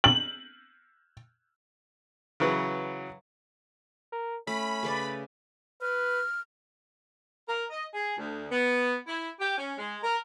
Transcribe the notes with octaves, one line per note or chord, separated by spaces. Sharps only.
F#7
C#3 E3 F#3 B4
A#4
A3 C#4 B5
C#3 B4 D5
B4 F6
A#4
D#5
G#4
D2
B3
E4
G4
C#4
G#3
A#4